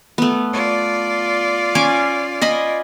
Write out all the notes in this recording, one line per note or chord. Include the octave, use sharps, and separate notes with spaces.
A3 B3
F4 D5
C#4 G#5 D6
D#5 G#5 B5